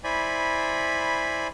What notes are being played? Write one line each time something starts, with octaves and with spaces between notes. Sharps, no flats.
E4 C5 D5 G#5 B5